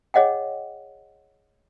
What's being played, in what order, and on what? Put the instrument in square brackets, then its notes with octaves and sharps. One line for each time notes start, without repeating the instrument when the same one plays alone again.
[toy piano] G#4 C#5 D#5 F#5 G5